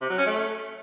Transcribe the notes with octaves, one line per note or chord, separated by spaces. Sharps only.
C3
F#3
C#4
A3